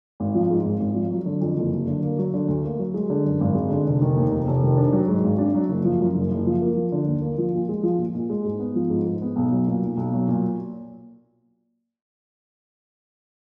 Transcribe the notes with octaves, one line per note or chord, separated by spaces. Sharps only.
G#1
F3
G#2
G#1
G#1
F3
F#3
D3
F2
F#1
F#3
D3
A#3
F#3
D3
D2
A#3
F#3
G#3
D3
F#2
G#1
G#3
D3
F1
D#3
D#2
F1
F1
D#3
D4
F#3
G#2
G#1
D4
F#3
F#1
F3
F#2
F#1
F#1
F3
A#3
F3
D3
D#2
A#3
F3
A#2
G#3
F3
A#2
A#2
G#3
G#2
B3
F3
G#2
G#2
B3
B1
F#3
A#2
B1
B1
F#3
A#2